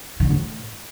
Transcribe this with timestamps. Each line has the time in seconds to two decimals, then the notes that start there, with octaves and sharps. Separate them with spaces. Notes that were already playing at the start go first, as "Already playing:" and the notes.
0.20 D#3
0.25 D3
0.30 A2